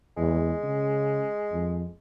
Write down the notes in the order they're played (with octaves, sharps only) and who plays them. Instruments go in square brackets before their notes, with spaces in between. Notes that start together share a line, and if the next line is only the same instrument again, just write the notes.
[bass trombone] E2 [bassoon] G#3
[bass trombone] C#3
F2